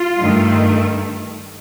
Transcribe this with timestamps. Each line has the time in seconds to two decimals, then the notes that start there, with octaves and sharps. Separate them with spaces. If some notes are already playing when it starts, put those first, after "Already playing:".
Already playing: F4
0.18 G2 D#3 A3